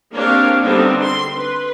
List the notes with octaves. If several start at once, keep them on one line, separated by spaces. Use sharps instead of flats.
A#3 C4 D4 G4 C#5 F5
D3 G3 B3 C4 D4 D#4
C6
B4